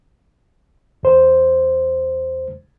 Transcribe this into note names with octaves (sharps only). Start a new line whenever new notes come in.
E2 C5